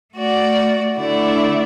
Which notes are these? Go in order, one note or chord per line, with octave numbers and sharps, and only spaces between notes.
A3 F#4 D5
D3 A3 E4 D5